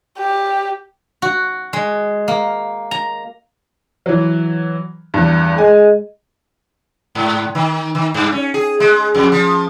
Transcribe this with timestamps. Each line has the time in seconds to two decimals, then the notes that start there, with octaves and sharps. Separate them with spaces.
0.18 G4
1.22 F#4
1.73 G#3
2.28 A#3
2.91 A#5
4.06 E3 F#3
5.14 E2 G2
5.58 G#3 G#5
7.15 G#2
7.55 D#3
7.95 D#3
8.14 G2
8.32 C#4
8.54 G#4
8.80 G#3
9.15 F2
9.32 F3